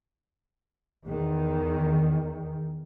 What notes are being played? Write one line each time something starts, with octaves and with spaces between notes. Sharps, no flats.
E2 D#3